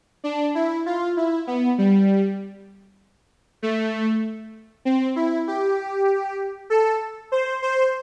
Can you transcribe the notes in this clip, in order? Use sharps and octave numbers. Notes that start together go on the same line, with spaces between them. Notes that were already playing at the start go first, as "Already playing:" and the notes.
D4
E4
F4
E4
B3
G3
A3
C4
E4
G4
A4
C5
C5